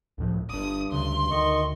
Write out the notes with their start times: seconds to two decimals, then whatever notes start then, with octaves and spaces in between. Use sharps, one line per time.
0.18 C#2 A2 F3
0.50 G1 G2 D4 D#6
0.92 D2 C#3 C6
1.31 D2 D#3 D#5 C#6